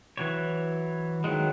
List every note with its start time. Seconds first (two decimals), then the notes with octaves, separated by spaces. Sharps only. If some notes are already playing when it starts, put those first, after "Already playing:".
0.17 E3 F#3 C#5
1.24 D#3 E3 F#3 G#3